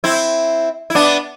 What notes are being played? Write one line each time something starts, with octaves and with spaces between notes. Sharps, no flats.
C4 E4
E4
B3 D4